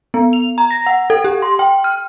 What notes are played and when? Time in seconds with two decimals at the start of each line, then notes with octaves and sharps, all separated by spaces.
0.14 B3
0.33 F7
0.58 A#5
0.71 A#6
0.86 F#5
1.10 A4
1.24 G4
1.42 C6
1.59 G5
1.84 F6